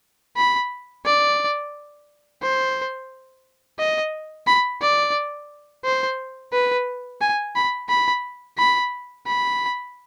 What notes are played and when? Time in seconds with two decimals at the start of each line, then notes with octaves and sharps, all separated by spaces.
0.37 B5
1.05 D5
2.42 C5
3.79 D#5
4.47 B5
4.82 D5
5.85 C5
6.53 B4
7.21 G#5
7.55 B5
7.89 B5
8.58 B5
9.27 B5